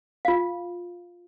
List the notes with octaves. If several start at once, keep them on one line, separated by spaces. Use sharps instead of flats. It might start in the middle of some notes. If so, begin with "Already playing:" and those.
F4 F5